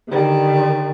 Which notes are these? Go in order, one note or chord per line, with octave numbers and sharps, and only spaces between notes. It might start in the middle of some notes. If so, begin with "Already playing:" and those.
D3 D#3 G3